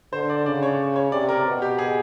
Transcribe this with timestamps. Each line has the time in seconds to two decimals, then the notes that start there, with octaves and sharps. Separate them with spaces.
0.13 D3 C5
0.30 D5
0.46 C#3 D5
0.63 C#5
0.96 C#5
1.12 C3 D5
1.29 A#4
1.46 B2
1.62 G4
1.78 G#4